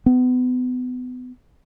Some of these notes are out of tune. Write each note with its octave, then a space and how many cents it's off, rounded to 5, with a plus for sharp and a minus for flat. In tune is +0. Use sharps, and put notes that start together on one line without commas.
B3 +30